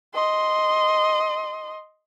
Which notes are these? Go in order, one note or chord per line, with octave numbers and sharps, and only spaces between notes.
D#5 C6